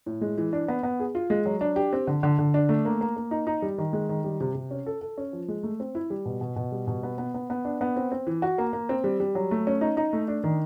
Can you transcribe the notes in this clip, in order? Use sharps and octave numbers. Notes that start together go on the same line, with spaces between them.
A2
G#3
E3
D4
B3
B3
G#4
F4
G#3
F#3
D4
G4
C4
D3
D3
D3
D4
A3
A#3
A#3
A#3
D#4
D#4
G3
D#3
G#3
D#3
G3
C3
C3
C#4
A4
A4
C#4
F3
G#3
A3
C4
E4
G3
B2
B2
B2
G3
B2
B3
B3
B3
B3
D4
B3
C4
C4
E3
F#4
A#3
A#3
C4
G3
G3
F#3
A3
C#4
D#4
D#4
A3
D4
D#3